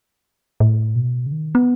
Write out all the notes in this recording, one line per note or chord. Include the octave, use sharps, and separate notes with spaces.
A2
B2
C#3
D#3
B3